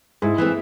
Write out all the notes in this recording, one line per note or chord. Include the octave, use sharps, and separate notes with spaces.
G#2 E4 G#4
E3 A3 C4